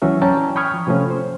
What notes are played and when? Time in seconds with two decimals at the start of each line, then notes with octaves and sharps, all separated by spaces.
0.02 C#2 E3 F#3 C#4 F#4 E5
0.22 C#4 D5 G5 A5 A#5
0.56 G5 B5 C#6 D#6 F6 G#6
0.74 F3
0.87 C3 F3 A3 C#4
1.10 C5